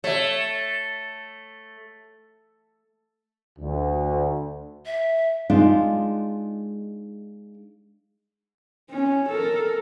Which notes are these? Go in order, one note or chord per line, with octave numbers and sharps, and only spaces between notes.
A3 C#5 E5
D2
E5
G#3 D4 D#4 F4
C#4
A4 A#4